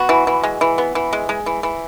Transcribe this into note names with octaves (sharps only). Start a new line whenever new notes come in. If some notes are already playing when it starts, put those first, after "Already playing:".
Already playing: B3 F#4
E3
E3
G#3
E3
B3
E3
G#3
G#3
E3
E3